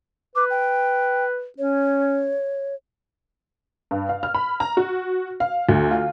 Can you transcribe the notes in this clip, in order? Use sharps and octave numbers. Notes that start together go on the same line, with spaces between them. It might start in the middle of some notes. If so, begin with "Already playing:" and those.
B4 D6
G5
C#4 C#5
G2
F5
F6
B5
A#5
F#4
F5
D2
F4